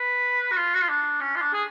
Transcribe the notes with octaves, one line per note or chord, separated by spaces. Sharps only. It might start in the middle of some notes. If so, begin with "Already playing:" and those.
Already playing: B4
F#4
F4
F#4
F4
D4
C#4
F4
D4
G#4